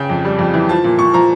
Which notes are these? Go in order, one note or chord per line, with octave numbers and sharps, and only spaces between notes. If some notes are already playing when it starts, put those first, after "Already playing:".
Already playing: C#3 G5
F2
G3
F2
E3
F3 A5
A#2
A#2 C#6
F3 A#5